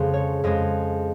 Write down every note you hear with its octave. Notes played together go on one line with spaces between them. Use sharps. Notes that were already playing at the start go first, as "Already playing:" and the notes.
Already playing: F2 C#3 G#3
C#5
F2 C#3 G#3 D#5